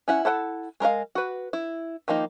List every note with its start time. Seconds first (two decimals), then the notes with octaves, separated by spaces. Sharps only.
0.08 C#4 E4 F#5
0.25 E4 A4 F#5 G5 A5
0.80 G#3 A#4 D#5 F5
1.15 F#4 B4
1.53 E4
2.08 D#3 F3 A#3 D#4